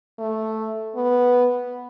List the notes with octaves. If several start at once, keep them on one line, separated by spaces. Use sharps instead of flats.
A3
B3